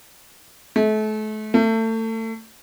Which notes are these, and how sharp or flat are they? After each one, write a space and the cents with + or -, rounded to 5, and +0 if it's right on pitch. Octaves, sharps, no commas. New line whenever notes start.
A3 -35
A3 +30